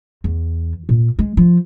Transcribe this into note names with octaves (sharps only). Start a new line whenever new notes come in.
E2
A#2
G#3
F3